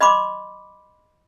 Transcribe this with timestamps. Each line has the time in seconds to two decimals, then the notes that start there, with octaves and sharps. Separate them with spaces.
0.01 D#5 B5 C6 D6